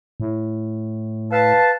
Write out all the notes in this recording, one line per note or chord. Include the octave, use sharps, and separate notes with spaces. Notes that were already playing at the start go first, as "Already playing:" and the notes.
A2
B4 F5 A5